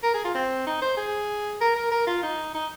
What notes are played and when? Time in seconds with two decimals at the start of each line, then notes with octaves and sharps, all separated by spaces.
0.03 A#4
0.14 G#4
0.25 F4
0.34 C4
0.67 D#4
0.82 C5
0.97 G#4
1.61 A#4
1.76 A#4
1.92 A#4
2.07 F4
2.23 D#4
2.55 D#4